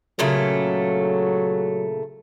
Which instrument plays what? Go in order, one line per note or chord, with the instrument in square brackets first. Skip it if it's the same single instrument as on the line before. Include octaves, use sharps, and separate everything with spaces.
[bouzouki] A#2 C#3 A3 [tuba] F#3